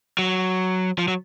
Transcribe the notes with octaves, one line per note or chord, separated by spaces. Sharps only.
F#3
F3
F#3